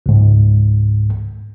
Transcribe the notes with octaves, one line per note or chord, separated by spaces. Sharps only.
C#2 G#2